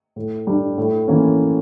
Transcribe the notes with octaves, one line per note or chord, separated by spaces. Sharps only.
A2
G3 D4
A2
E3 A#3 C#4